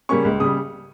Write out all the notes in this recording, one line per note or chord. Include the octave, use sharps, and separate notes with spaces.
C#3 G3 A#3 C#4 C#6
C#2
C#3 G3 D#6